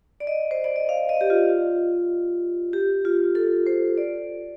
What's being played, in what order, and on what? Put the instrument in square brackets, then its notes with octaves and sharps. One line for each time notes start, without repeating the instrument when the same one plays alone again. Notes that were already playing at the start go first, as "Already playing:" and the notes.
[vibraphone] D5
D#5
C5
D5
D#5
F5
D#5
G4
F4
G4
F4
A4
C5
D5